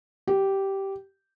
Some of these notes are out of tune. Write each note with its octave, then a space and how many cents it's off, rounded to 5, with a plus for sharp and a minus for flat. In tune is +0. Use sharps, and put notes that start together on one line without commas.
G4 -10